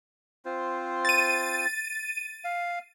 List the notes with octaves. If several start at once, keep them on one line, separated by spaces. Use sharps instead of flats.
C4 F4 C5
A6 D#7
F5